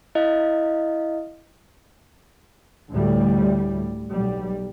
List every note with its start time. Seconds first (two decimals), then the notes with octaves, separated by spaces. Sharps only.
0.15 E4 D#5 F5
2.91 D2 A2 G3
4.11 B1 G3